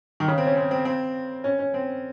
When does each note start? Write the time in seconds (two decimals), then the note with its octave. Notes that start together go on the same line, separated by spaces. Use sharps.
0.20 D#3
0.28 C#3
0.38 C4
0.47 C#4
0.57 C4
0.71 C4
0.85 C4
1.44 C#4
1.59 C#4
1.74 C4